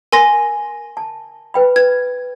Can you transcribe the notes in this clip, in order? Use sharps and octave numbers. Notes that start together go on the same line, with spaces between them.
A#4 G#5 C6 A#6
A5
B4 G5 B5
B4 G#6